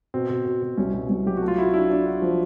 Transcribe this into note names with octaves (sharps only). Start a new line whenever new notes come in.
B2 C4
B2
B2
B2
C2 C#4
B2
C2
F#3 G4
F#4
A3
F4
E4 F#4
D4 E4
D4
F#4
F3